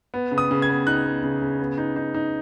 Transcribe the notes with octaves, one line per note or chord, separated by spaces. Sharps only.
B3
C#3
D#6
C#3
G#6
B3
D#4 F#6
B3
C#3
C#3
B3
D#4
D#4
D#4